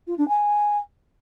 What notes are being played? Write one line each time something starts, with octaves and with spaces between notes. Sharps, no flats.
F4
D4
G#5